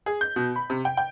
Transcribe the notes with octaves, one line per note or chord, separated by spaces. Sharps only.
G#4
G6
B2
B5
C3
G5
G5